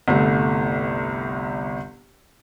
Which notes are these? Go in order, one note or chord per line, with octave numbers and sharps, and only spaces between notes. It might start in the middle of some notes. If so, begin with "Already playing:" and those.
G1 C2 A3